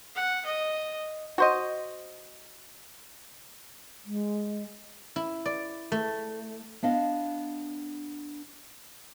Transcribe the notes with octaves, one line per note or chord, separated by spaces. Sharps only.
F#5
D#5
F#4 C5 D#5
G#3
E4
D5
A3
B3 D4 D#5 F5